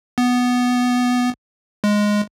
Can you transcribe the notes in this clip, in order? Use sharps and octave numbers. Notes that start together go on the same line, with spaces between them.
B3
G#3